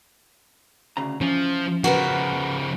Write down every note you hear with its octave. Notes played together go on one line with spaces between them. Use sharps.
D2 C#3 A#5
E3 F3 C#4
C#3 F3 F#4 A#4 B4